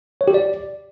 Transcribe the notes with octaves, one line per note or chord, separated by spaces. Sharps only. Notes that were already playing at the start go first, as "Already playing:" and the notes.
C#5
G4
D5